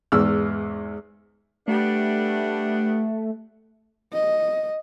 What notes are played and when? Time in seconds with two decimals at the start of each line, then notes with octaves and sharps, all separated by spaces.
0.12 E2 G#2 E6 F6
1.68 G3 A3 B3 D4
4.13 D#5